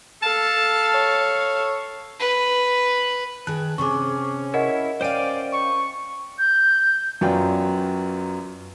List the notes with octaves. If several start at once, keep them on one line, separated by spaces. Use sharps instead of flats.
A4 F5 A5
C#5
B4
D#3 G#4 A5 F#6
C3 C4 C#4 G#4 C#6 D6
E4 A#4 C#5 D#5 F#5
C#4 C5 D5 F5 G5 G#5
C#6
G6
F#2 F#3 B3 F4 D5 G5